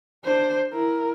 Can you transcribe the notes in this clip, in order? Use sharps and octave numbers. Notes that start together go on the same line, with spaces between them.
D4 C5
E4 A#4